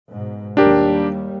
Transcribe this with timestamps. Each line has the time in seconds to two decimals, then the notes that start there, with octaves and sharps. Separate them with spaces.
0.12 G#2 B2
0.57 D#2 G3 D4 G4 A#4